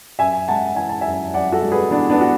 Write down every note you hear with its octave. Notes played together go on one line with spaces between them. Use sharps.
F#2 E5 G#5
G#3 F#5 A5
E3 G#5
A5
F#2 E5 G#5
F#2 D5 F#5
F#4 A4
G#3
G#4 B4
E3 B3 D4
B3 D4
F#4